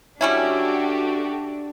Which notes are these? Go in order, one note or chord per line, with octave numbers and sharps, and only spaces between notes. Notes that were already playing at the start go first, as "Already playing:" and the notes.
G3 C#4 D4 E4 F#4 G4 A4